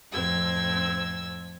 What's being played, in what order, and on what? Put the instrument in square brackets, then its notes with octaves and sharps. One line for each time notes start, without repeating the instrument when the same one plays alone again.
[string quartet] F2 A2 C4 E6 G#6